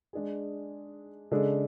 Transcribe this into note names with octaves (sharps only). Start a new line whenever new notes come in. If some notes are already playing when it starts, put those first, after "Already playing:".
G#3 D4 G#4
C#3 G#3 D4 A4